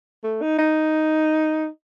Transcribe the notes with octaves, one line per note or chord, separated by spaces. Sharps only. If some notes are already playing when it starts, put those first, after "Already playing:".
A3
D#4
D#4